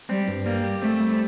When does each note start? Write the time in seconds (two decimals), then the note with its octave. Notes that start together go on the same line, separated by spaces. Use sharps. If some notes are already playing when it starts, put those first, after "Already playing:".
0.09 G3 C4
0.28 G2
0.45 G3 A#3
0.64 G4
0.82 A3 C4
1.00 G3